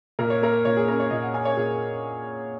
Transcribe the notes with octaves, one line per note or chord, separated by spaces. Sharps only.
A#2 A#4
C#5
A#3 A#4
A#2 C#5
G#4
C#4 A#4
C#5
A#2 D#5
F#5
A#3 G#5
C#5
A#2 G#4